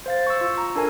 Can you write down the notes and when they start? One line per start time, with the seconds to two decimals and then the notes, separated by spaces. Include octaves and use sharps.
0.06 C5 F5 A6
0.27 C#6 E6
0.41 F4
0.58 A#5
0.76 D4 A4 A#4 G#5